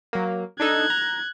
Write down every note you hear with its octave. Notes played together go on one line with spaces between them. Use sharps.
F#3 A#3
D4 D#4 A4 F#6 G#6
A#5